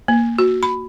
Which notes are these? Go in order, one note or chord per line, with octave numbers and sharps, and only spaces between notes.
A#3
F#4
B5